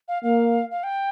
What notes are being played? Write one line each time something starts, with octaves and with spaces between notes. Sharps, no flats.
F5
A#3 F5
F5
G5